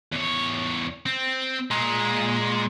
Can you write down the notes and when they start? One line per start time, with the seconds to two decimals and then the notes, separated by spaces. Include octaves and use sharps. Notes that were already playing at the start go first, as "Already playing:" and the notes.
0.12 E2 C#5
1.06 C4
1.71 A#2 G#3